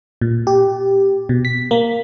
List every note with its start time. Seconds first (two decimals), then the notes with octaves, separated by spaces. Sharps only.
0.21 A#2
0.47 G4
1.29 B2
1.45 B6
1.71 A#3